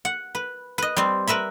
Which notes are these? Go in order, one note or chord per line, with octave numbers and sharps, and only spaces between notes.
F#5
B4
B4 D#5
G3 C4
A#4 B4 E5 B5